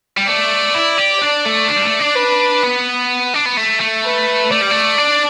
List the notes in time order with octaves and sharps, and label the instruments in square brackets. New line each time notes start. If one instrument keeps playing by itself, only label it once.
[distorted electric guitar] G3
[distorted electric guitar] A3 [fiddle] D5
[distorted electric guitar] E4
G4
[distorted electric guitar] D4 [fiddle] D5
[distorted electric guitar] A3
D4
G3
A3
D4
[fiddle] B4
[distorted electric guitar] B3
D4
B3
A3
A3
[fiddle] B4
[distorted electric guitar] A3 [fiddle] D5
[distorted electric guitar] G3
A3
D4